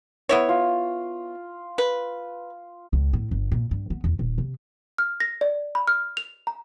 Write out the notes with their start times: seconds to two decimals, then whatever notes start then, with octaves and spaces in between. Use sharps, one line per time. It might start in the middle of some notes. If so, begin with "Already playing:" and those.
0.29 B3 E4 C#5
0.49 F4
1.78 B4
2.93 C#2
3.13 A2
3.31 G1
3.52 A#2
3.71 G2
3.90 B3
4.04 E2
4.19 D#1
4.38 C3
4.98 F6
5.20 A#6
5.41 D5
5.75 B5
5.87 F6
6.17 F7
6.47 A#5